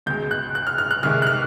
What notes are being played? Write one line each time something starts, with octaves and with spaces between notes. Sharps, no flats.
C#2 B2 G#3 G6
F#6
F#6
F6
F6
F#6
C2 C3 D#3 G#3 F6
F#6
F6